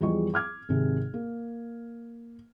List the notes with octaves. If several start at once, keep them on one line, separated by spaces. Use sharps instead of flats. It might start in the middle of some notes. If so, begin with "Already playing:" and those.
E2 F3 G3 G#4 D#5 C#6
D6 F6 G#6
G#1 C3 G#4
A#3